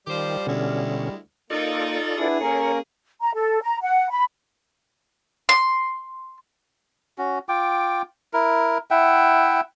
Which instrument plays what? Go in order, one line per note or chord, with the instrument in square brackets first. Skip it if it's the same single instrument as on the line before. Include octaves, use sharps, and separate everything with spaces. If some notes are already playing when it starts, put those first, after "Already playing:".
[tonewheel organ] D#3 [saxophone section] F3 G4 C5 [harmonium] G3
[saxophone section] D2 G#3 E4 [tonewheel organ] B2 D3 C#4
[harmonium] A#3 [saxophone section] D#4 [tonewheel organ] F4 A4 D5
[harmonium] B3 D4 E4 [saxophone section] G#4
[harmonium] A#3 C#4 A#4 [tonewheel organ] A4 C#5
[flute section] A#5
A4
A#5
F#5
B5
[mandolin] C6
[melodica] C#4 F#4
F4 G5 D6
E4 A#4
E4 E5 F#5 G5